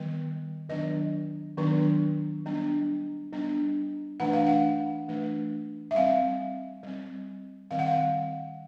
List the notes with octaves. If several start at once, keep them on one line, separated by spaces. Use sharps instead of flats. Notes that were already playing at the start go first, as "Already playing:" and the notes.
Already playing: D#3 G3 B3
D#3 F#3 B3 D4 D#5
D#3 F#3 B3 D4
G3 B3 D4
G3 B3 D4
E3 A3 D4 F#5
F5
F#5
E3 A3 D4
E5
G3 C4 F5
G3 C4
D#3 G3 C4 F5
F#5
F5